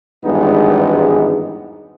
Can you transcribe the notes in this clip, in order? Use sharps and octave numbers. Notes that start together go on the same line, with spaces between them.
G#1 E2 G2 G#3 B3 D#4